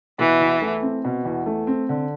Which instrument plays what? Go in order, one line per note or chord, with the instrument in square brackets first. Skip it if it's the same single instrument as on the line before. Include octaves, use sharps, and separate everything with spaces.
[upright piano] B2 [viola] E3
[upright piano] E2
A3
C4
B2
E2
A3
C4
D3